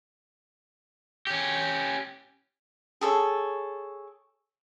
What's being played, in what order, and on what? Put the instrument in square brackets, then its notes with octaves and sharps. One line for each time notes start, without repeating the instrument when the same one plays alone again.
[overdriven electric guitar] C#4 G4
[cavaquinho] G#4 A4 C#5